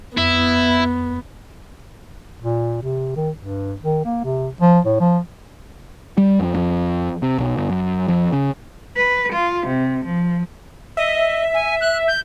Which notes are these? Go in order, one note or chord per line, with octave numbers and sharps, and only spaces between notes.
F2 B3 E4
A#2
C3
D#3
G2
D#3
A#3
C3
F3
A2
F3
G3
F2
F2
C3
B1
G1
F#2
F2
C#3
B4
F4
C3
F3
D#5 E5
G#5
F#6
G6